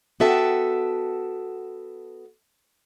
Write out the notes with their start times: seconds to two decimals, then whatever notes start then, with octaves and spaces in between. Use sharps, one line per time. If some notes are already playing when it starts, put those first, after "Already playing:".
0.20 B3 F#4 A4 E5 G5 A5